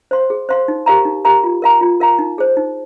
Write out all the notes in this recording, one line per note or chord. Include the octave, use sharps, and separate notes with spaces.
C5 F5 C6
G#4
C5 F5 C6
D#4
G4 A#4 F5 A#5
D#4
G4 A#4 F5 A#5
F4
A#4 F5 A#5
F4
A#4 F5 A#5
D#4
G#4 C5
D#4